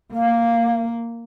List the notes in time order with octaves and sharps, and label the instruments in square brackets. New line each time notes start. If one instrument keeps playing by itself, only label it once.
[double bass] A#3 [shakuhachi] F5